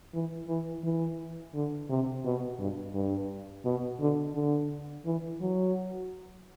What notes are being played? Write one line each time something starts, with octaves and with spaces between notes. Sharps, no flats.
E3
E3
E3
D3
C3
B2
G2
G2
B2
D3
D3
E3
F#3